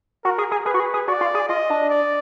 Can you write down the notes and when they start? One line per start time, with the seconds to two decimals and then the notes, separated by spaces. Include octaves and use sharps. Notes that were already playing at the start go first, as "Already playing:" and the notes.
0.25 F#4 A#4
0.38 G#4
0.51 G#4
0.66 G#4 B4
0.74 F#4
0.80 G#4
0.94 G#4
1.07 F#4 D5
1.21 F4
1.34 G#4
1.48 F4 D#5
1.70 D4
1.90 D5